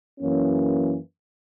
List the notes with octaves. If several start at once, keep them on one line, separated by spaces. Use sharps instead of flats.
F#2 E3 A#3 C#4